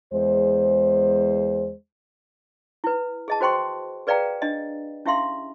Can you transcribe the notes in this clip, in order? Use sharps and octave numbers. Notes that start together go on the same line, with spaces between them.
E2 G#3 C5
E4 B4
G#4 D#5 A5
F#4 C5 G5 C6 C#6
G#4 B4 D5 F5 G5 A#5
D4 D#5
C#4 E4 G4 E5 F5 C6